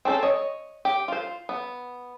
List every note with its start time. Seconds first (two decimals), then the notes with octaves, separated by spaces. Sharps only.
0.05 C4 C#4 A4 B4 C5
0.23 C#5 D#5
0.85 G4
1.08 F4 C5
1.49 B3